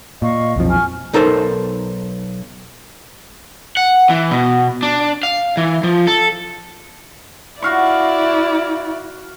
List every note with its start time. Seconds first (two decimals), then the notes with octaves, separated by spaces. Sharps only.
0.22 A#2 D#5 F5 C#6
0.56 B1 F2 F3
0.69 G#5 C#6 F6
1.13 B1 D#4 A4 A#4 C5
3.77 F#5
4.10 E3
4.31 B2
4.83 D4
5.23 F5
5.57 E3
5.84 F3
6.07 A4
7.62 E4 F#4 D5 F5 C#6